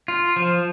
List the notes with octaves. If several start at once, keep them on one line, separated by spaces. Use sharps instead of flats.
F4
F3